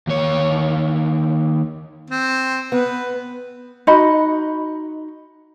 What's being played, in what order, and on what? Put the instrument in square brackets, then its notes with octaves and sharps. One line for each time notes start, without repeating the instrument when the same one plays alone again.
[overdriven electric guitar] D#2 C#5
[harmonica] C4
[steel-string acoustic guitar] B3 [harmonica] B4
[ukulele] D#4 F#4 D#5 B5